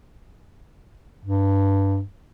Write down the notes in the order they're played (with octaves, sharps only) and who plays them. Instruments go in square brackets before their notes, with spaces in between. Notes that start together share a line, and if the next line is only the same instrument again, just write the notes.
[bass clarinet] G2